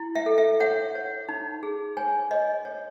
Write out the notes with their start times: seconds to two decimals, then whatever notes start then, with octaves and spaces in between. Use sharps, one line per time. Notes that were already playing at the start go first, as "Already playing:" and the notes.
Already playing: E4
0.15 E5
0.26 A4
0.38 E5
0.60 C#5 F#5
0.95 C#5
1.29 D#4
1.63 G#4
1.97 C#5 G#5
2.31 C#5 D#5
2.65 C#5